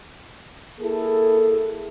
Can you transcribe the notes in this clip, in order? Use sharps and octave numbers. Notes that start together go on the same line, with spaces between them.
A#3 E4 G#4 A4